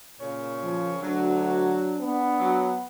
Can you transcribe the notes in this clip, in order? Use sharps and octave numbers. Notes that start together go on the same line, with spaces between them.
A#2 C#3 A#4 C#5
F3
D2 F#3 D4
B3
F#3